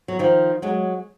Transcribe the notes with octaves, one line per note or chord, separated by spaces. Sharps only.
F#3
D#3 F3
F#3 G#3